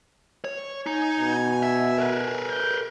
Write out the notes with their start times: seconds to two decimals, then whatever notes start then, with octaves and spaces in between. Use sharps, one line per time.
0.45 C#5
0.87 D#4 G#5
1.19 B2
1.63 E5
1.98 A#4 B4
2.50 G6